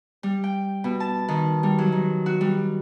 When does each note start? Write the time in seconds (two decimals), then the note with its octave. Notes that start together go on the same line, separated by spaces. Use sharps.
0.23 G3
0.44 G5
0.84 B2
1.00 A5
1.28 D#3
1.63 G3
1.78 F#3
1.92 D#3
2.26 F#4
2.41 G3